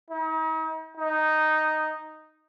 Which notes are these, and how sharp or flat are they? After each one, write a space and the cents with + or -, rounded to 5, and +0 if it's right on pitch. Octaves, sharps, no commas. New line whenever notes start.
D#4 +40
D#4 -5